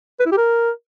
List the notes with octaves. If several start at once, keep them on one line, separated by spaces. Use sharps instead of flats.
B4
E4
G4
A#4